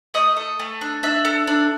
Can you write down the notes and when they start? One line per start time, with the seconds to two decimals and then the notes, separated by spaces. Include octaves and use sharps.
0.14 A3 D#5 D#6
0.37 A4
0.60 A3
0.81 D4
1.03 D4 E5 E6
1.25 A4
1.47 D4